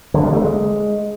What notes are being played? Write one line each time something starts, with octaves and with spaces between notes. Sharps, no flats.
D3
G3
A3
G#3